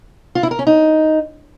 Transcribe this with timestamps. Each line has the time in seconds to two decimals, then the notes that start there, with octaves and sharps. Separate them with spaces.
0.35 F4
0.43 E4
0.51 A#4
0.59 C#4
0.67 D#4